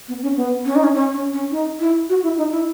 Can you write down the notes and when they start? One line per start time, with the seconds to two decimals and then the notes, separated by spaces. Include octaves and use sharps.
0.08 B3
0.22 C#4
0.37 B3
0.65 C#4
0.75 D#4
0.84 C#4
0.95 C#4
1.13 C#4
1.33 C#4
1.51 D#4
1.80 E4
2.09 F#4
2.23 E4
2.38 D#4
2.52 E4